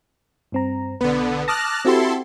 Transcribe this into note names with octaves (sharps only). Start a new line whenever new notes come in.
G2 C4 A#5
B1 D3 B3 B4
A5 D6 D#6 F6 F#6 A#6
C4 E4 F#4 G4 A4 C6